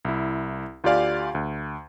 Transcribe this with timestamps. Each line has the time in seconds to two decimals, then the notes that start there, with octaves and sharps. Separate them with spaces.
0.05 C2 E4
0.84 D2 F4 G4 D5 F5 G#5
1.35 D2